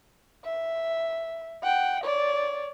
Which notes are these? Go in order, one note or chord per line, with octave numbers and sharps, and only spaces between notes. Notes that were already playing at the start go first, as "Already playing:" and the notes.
E5
F#5 G5
C#5 D5